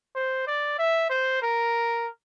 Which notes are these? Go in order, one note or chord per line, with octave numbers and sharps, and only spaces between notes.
C5
D5
E5
C5
A#4